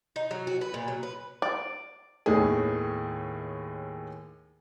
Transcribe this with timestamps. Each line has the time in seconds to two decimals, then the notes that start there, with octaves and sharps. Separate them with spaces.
0.16 D#4
0.31 F#3
0.47 F#4
0.61 B4
0.74 A#2
0.88 F#3
1.03 B4
1.42 D5
2.26 D#2 A2 D#3 A3 B3 G#4